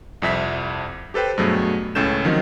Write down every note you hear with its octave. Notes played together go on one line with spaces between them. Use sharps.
C2 F2 E5 B6
G4 A4 B4 C5 G5
G2 B2 F#3 A3 G#4
C#2 A2 C#4 A4 G6 E7
D#3 F3 F#3 C4 D#4